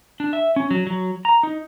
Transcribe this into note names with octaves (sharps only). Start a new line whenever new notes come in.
D4
E5
C#4
F#3
F#3
A#5
D#4